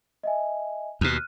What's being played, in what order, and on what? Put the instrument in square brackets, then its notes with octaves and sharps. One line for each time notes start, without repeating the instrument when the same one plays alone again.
[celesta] D#5 E5 G#5
[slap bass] D#2 B2 [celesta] F6 F#6 D#7